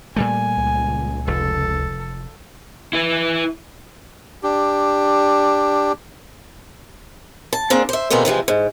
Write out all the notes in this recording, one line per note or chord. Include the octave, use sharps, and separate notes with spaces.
A#2 G3 A3 G#5
C#2
F1 A4
E4 B4
D4 G4
A5
A#3 C4 D4 G#4
C5 E5
E2 B2 D3 G#3 A#3 C4
C3 E3 F3 G#3
G#2